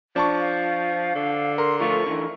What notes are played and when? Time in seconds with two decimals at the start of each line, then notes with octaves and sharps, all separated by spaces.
0.16 F3 D4 A5 C#6
0.40 F5
1.15 D3
1.58 A#4 C6
1.80 F3 A3 F4 C#6
2.06 D3 E3